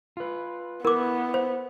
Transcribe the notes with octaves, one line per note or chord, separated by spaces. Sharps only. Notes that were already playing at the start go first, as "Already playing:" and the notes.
F4 B4
B3 E4 A#4 B4 D6
C5